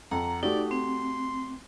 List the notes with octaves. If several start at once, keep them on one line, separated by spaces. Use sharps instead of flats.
F2 F#5 A#5
A3 D#4 F#4 G4 D5
C4 C6